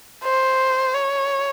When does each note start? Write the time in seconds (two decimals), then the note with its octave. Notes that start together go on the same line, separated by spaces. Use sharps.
0.24 C5
0.95 C#5